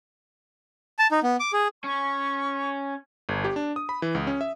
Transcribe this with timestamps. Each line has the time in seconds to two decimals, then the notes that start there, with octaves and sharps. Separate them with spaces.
0.99 A5
1.11 D#4
1.23 B3
1.40 D6
1.53 G#4
1.84 C#4 C#6
3.29 G1
3.44 G4
3.56 D4
3.76 D#6
3.89 B5
4.02 E3
4.15 C#2
4.27 C#4
4.41 E5